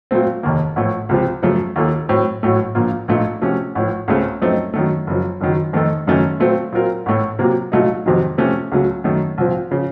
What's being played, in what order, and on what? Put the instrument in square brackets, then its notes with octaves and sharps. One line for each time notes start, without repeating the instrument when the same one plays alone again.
[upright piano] A#2 F#3 A3 C4
F1 D#2 D#3 A#3
A1 A2 F3 A3
C#2 C3 F3 C4 F4
F#2 C#3 F3 A3
D#2 D#3 A#3 F4 A4
A2 F#3 C4
A1 A2 F#3 A3
A#1 A#2 F3 A#3 F4
A#1 A#2 A3 D#4
C3 F3 A3 C#4 F#4
A1 A2 F3
C#2 C#3 A3 C4
F#2 F3 A3 C4 D#4
F#2 D#3 A3
F#1 F#2 F3
F#1 F#2 D#3 F#3
F2 D#3 A3 D#4 A4
F#1 F#2 D#3 A3 C#4
A#2 F#3 A3 C4
A#2 F#3 C4 F4 A#4
A1 A2 A3
C3 F#3 A#3 F4
C2 A#2 F#3 A3 D#4
F2 C3 D#3 F#3
C3 F3 A3 C#4
C#2 C#3 F#3 A3
F#2 D#3 A3
C2 A#2 F3 C4
C#3 F3